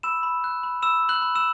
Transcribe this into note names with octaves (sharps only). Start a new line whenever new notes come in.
B5 E6 E7
B5
F#6
B5
B5 E6 E7
B5
F#6 F#7
B5
E6 E7